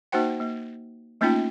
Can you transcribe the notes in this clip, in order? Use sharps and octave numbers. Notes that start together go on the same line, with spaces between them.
A#3 D#4 F#4 C5 F#5 G5
A#3
A3 A#3 C#4 D#4 F4 G5